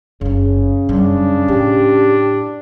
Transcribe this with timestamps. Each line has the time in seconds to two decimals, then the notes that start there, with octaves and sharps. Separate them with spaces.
0.21 F#1 C#3 D4
0.89 F#2 G3 D4
1.48 A2 E4 G4